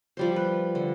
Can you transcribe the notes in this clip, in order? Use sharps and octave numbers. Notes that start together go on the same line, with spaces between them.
F3 G3 C5
B4
D3